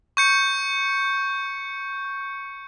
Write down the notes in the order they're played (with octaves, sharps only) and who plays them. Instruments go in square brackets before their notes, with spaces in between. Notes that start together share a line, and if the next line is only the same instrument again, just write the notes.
[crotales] C#6 G6 C#7